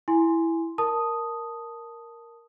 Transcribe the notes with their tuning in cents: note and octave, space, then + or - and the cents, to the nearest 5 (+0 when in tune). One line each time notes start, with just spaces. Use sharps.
E4 +0 G#5 +0 C6 +0
A#4 +0 A5 +0 D#6 +0